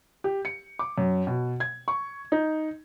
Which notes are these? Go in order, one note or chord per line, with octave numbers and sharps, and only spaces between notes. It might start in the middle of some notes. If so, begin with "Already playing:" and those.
G4
C#7
D6
F#2
B2
G#6
C#6
D#4